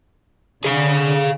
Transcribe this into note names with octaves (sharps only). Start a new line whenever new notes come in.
D3 G#4 F5